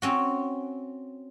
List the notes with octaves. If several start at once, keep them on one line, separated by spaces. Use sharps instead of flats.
C4 C#4 F#4